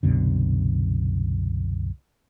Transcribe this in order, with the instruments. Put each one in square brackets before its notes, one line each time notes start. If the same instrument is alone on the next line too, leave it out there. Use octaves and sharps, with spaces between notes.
[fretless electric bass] C2 F#2 B2 D3